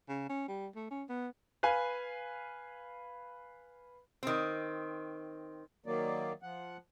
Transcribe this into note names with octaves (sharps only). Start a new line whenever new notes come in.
C#3
C#4
G3
A3
C#4
B3
B4 F5 G#5
D#3 C4
D#3 F#3 A#3 D5
F3 F#5